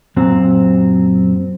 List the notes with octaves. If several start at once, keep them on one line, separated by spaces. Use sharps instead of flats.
F#2 A#2 F#3 C4